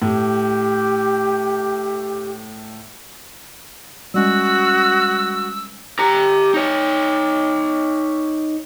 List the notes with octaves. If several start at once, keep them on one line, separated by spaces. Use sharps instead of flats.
A2 G4
G3 G#3 C#4 F#4 E6
G4 A#5
D#4 C#5